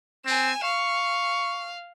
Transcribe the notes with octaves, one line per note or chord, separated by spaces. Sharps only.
C4 G#5 E7
F5 C#6